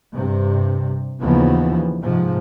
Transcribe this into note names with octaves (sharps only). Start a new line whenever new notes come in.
G2 C3
D#2 C#3 E3 F3 B3
G#2 C3 F3